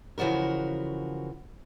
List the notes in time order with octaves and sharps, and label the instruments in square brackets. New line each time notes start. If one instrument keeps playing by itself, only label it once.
[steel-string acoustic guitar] C#3 E3 F3 F#4 A#4